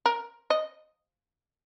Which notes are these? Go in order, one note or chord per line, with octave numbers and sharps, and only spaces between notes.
A#4
D#5